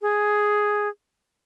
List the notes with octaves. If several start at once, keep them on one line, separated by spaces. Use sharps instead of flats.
G#4